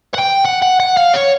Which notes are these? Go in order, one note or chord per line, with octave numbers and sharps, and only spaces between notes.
F#5
G5
F#5
F#5
F#5
F5
C#5